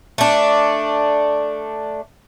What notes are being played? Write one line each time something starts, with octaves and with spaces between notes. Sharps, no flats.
A3 D4